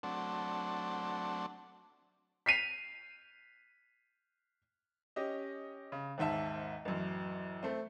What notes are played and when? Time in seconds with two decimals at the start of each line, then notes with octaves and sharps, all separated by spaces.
0.03 F#3 A3 C4 D4
2.46 B6 C7 D#7 F7
5.16 C#4 G4 D#5
5.92 C#3
6.18 G#1 D#2 G#2 E5 A5
6.85 A1 F#2
7.63 A3 C4